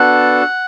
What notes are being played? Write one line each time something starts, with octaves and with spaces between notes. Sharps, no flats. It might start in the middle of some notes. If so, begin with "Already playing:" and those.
Already playing: B3 D4 F#4 A4 F#5